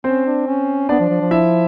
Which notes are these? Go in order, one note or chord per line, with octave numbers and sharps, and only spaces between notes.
C4 C#4 C5
D4
C#4
B3 D4 D5
F3
F3
F3
E4 E5